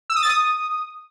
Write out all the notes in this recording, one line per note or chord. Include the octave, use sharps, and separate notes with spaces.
E6
D#6
A6
D#6